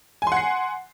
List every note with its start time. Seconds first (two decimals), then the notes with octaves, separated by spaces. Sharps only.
0.22 G#5
0.27 C6
0.32 F#5
0.37 C7